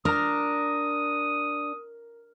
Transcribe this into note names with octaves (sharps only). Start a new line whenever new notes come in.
D4 A#4 A#5 D#6